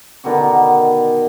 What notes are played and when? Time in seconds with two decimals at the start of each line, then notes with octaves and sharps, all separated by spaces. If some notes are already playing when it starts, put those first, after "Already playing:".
0.24 B2 D3 D#3 F#4